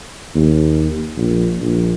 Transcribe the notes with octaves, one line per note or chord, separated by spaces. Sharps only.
D#2
A#1
A#1